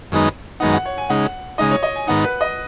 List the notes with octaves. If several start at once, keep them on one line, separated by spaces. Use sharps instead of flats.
F#2 D#3 G#3 B3 D#4
F#2 D#3 G#3 B3 D#4 F#5
F#5
C#5
G#5
C#3 G#3 D#4 F#5
C#3 G#3 D#4 D#5
C#5
D#5
G#5
G#2 D#3 B3 D#4 F#5
B4
D#5